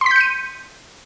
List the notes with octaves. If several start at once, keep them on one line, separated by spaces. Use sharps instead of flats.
C6 G6 B6 C#7 D#7